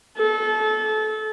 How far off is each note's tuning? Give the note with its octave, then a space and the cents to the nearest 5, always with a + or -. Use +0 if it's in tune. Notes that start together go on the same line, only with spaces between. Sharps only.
A4 -25